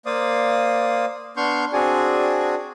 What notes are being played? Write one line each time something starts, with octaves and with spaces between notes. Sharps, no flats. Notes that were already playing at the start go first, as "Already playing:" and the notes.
A#3 C5 D5 F5 D#6
B3 D4 C6 C#6 F6 G6
C4 D4 F#4 G#4 D5 G#5